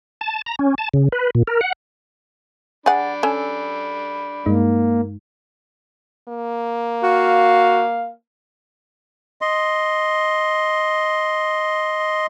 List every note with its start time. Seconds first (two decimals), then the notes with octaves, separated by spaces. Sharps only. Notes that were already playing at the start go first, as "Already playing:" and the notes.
0.21 A5
0.46 A#5
0.59 C#4
0.78 A5
0.94 C#3
1.12 B4
1.35 A#2
1.47 A#4
1.61 F#5
2.86 D4 G#4 F#5 B5 A6
3.23 C#4 A4 G#5 E6
4.46 G2 G#3 A#3 D#4
6.28 A#3
7.03 F#4 F5
9.41 D#5 C6